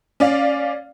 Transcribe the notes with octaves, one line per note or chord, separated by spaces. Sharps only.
C#4 D5 F5